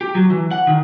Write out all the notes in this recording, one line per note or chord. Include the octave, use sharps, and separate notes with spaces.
G4
F#3
E3
F#5
D#3